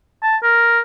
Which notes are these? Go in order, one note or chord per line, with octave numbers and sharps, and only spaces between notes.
A5
A#4